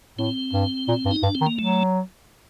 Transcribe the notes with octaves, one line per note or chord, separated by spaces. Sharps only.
A2 C4
G2
A#2
G2
D#4
G2 D4
C4
D#3
A#3
F#3 A3